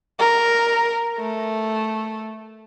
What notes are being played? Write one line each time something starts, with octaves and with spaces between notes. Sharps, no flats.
A#4
A3